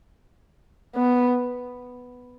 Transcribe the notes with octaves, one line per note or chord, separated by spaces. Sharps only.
B3